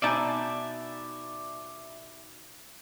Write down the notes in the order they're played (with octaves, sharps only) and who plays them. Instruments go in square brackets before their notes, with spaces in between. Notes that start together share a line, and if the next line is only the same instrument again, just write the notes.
[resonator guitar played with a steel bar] B2 D#4 G#5 [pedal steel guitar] D5 E5 A5